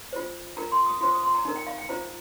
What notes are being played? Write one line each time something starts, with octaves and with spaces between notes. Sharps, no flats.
F4 C5
F4 A#4 A#5
C6
D#6
F4 C5 C6
D#6
C6
A#5
D#4 A#4 A#5
G5
F5
G5
F4 C5 A#5